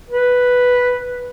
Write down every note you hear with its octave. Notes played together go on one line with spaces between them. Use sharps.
B4